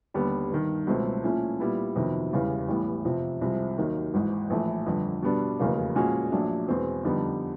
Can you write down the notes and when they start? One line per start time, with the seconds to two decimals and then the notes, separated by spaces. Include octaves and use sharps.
0.14 D#2 D3 G3 B3
0.50 G1 G2 D#3
0.87 C#2 B2 F#3 A3 C4
1.24 A#2 F3 A3 C#4 E4
1.60 A#2 G3 B3 E4
1.96 F2 C3 D#3 F#3 B3
2.32 E1 E2 C#3 E3 G3
2.68 A1 A2 E3 G3 B3
3.05 F2 C3 F3
3.41 C2 C3 F3 G#3
3.78 D#2 D#3 F#3 A#3 D#4
4.14 G#1 G#2 E3
4.50 A#1 A2 E3 A3
4.86 G1 F2 D3
5.23 B2 G3 B3 D4
5.60 F1 E2 C#3 F#3 A#3
5.95 A#2 F3 G#3 C#4 F#4
6.32 A#1 A#2 F#3 A3 D4
6.68 E2 B2 G#3 C4
7.05 F2 D3 G3 B3 D#4